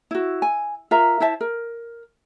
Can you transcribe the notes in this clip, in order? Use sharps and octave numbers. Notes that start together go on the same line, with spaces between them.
E4 F#4
G#5
F4 A#4 E5 A#5
E4 C5 E5 A5
A#4